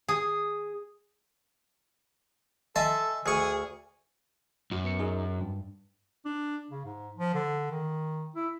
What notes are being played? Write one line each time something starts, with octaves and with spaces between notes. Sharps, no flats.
G#4
A4 D#5 E5 G#5 A5 C6 E6
D2 G#4 G#5 C#6
F#2
B3 C#7
D#4 G#4 A#4
G2
D4
C#3
G#2
F3
D3
D#3
E4